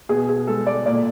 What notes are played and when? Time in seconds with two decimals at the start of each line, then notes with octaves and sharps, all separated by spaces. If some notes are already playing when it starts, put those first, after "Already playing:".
0.09 B2 G#4
0.29 G#4
0.47 G#3 A4
0.67 D5
0.86 A#2 D5